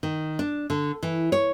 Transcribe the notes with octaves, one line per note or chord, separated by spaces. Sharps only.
D#3
D4
D3
E3
C#5